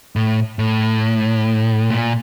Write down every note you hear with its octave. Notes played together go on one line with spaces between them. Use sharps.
A2
A2
A#2